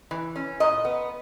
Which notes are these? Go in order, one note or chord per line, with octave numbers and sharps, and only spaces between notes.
E3
C#4
A#2 D#5
B3